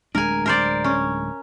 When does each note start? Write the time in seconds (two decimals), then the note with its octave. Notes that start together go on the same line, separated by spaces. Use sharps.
0.15 D1 G#3 D4 A#4 G#5
0.46 A#4 C5 D5
0.84 C#4